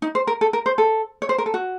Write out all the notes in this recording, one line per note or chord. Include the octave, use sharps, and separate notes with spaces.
D#4
C5
A#4
A4
A#4
C5
A4
C#5
C5
A#4
A4
F#4